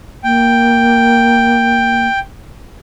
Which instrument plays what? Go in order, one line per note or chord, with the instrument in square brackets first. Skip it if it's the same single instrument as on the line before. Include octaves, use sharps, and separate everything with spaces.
[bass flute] A#3 [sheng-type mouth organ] G5